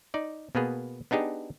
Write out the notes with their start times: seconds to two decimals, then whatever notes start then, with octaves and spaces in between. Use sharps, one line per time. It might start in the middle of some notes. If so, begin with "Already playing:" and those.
0.14 D#4 D5
0.55 B2 A#3 B3 G#4
1.11 B3 D4 D#4 G4 G#4